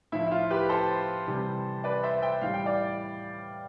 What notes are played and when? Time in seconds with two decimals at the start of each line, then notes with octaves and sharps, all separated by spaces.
0.12 A2 F3 E4
0.27 E4
0.31 F4
0.50 G4 B4
0.69 A4 C5
1.27 C3 E3 G3
1.84 B4 D5
2.04 C5 E5
2.22 E5 G5
2.41 A2 E3 G3 F5
2.54 G5
2.66 D5 F5